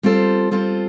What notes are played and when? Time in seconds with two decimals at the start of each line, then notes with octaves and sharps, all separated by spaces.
0.03 G3 C4 F4 A4 C5
0.51 G3 C4 F4 A4 C5